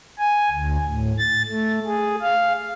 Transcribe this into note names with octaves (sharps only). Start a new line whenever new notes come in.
G#5
D2
A2
A6
A3
G#4
F5